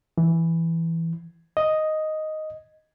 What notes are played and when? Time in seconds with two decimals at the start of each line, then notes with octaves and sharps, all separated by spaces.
0.18 E3
1.57 D#5